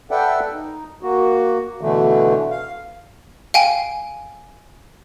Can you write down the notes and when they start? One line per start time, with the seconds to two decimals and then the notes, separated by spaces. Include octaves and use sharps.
0.11 A4 B4 D5 E5 F#5 G5
0.53 D#4
1.03 A#3 F#4
1.81 B2 D3 E3 A3
2.51 F5
3.54 F5 G5 G#5